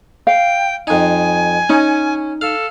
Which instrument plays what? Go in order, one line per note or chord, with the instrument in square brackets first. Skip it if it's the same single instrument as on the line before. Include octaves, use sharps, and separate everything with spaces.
[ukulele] F5 [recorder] G5
[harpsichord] F2 D#4 [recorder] G#5
[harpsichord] C#4 [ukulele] D#4
[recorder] A4 [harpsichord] F5